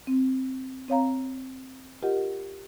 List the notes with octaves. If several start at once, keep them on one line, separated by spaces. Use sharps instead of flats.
C4
C4 C#5 F5 A#5
F4 G4 A#4 D#5 F#5